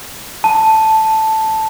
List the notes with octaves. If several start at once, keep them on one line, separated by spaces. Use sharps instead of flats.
A5